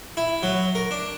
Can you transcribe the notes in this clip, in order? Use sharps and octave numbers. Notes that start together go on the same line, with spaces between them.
E4
F#3
A#4
D4